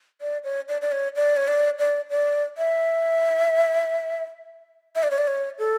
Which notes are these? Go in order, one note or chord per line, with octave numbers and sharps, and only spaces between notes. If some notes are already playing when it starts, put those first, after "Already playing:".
D5
C#5
D5
D5
C#5
D5
C#5
D5
D5
D5
E5
E5
D5
C#5
D5
C#5
A4